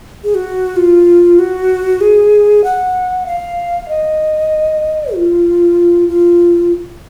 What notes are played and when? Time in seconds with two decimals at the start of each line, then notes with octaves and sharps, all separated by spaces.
0.24 G#4
0.35 F#4
0.76 F4
1.39 F#4
2.01 G#4
2.64 F#5
3.26 F5
3.89 D#5
5.14 F4
6.08 F4